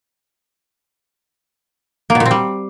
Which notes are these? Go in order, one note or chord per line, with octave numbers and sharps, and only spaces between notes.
A#3
B2
A#2
C4
G3